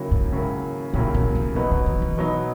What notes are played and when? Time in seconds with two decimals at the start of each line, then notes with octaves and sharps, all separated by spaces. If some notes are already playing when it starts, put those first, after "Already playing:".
Already playing: D#2 C#3 F#3 A#3 E4
0.11 G#2
0.32 D#2 C#3 F#3 A#3 E4
0.93 D#2 A#2 C#3 F#3 A#3 E4
1.14 B2
1.35 B2
1.55 B2 D#3 F#3 B3 D#4
1.71 C#3
1.86 D#3
2.02 E3
2.17 B2 F#3 B3 D#4